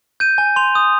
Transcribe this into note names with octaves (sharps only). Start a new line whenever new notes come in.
G6 D#7
G#5
C6 F7
D#6